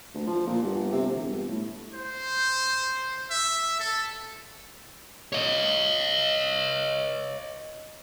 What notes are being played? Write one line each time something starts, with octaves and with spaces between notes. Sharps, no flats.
D2
F3
A#2
G1
C3
E1
G1
A2
C5
E5
A4
C#5 D#5